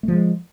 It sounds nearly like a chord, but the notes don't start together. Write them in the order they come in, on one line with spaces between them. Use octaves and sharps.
A3 F3 G#3